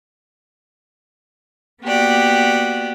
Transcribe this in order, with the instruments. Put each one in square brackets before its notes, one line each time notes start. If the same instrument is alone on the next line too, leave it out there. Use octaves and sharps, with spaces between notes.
[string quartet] A#3 B3 F#4 G4 D5